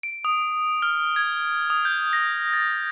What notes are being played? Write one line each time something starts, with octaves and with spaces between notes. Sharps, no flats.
D7
D#6
F6
G#6
D#6
G6
A#6
A6